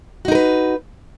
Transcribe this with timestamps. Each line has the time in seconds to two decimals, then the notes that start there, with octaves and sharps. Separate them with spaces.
0.25 F#4
0.28 D#4
0.32 A#4
0.35 B4